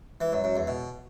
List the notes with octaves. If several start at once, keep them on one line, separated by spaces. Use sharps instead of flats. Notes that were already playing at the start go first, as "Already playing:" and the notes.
E3
F#2
F#2
E2
B2